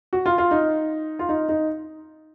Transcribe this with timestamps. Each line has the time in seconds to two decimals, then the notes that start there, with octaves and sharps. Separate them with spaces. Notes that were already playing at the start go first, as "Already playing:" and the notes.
0.13 F#4
0.26 F4
0.38 F4
0.51 D#4
1.19 F4
1.29 D#4
1.49 D#4